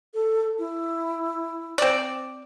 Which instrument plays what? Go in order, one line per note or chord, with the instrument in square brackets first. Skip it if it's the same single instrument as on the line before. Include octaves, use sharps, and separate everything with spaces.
[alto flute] A4
E4
[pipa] C4 D5